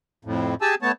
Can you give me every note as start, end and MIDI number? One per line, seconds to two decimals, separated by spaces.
0.25 0.55 41
0.25 0.55 45
0.62 0.75 67
0.62 0.75 68
0.62 0.75 80
0.62 0.75 81
0.62 0.75 88
0.82 0.92 57
0.82 0.92 59
0.82 0.92 73
0.82 0.92 81